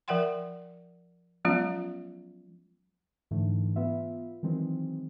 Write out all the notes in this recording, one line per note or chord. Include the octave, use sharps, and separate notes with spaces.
F3 A#4 E5 F#5 G5 C6
F3 F#3 G#3 B3 C#4 F4
G#2 D3 E3 A3
B3 F4 E5
D#3 E3 F#3 G#3 C4